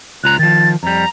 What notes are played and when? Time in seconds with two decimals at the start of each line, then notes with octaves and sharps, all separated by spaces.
0.24 C#2 F4 A#5 F#6
0.39 D#3 F3 A6
0.83 F2 G3 A#5